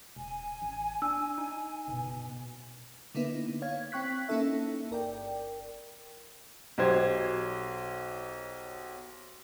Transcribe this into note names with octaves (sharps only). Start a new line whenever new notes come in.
E1 G#5
A1
D4 E6
D#4
F#1 B2
D3 A#3 B3 D#4 E4 B4
C#5 F5 G#6
C4 G5 C#6 F#6 B6
A#3 C#4 D#4 E4 A4 E5
G1 A#4 D5 G5
B1 F#3 G4 C5 G#6